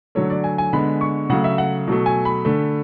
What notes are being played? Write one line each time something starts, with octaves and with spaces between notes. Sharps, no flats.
D3 F#3 A3 C#5
D5
G#5
G#5
D3 G#3 B3 B5
C#6
C#3 F#3 A3 F#5
E5
F#5
B2 F#3 A3
G#5
B5
D3 A3